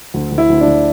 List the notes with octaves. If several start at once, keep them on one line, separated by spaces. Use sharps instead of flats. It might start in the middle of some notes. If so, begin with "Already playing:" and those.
D2
D2
E4
D2
D4
D2